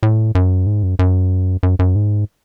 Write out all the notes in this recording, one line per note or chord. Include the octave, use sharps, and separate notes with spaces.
A2
F#2
G#2
F#2
F#2
F#2
F#2
G#2